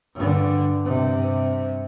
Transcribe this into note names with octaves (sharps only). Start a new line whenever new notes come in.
G2 D3
G2 C3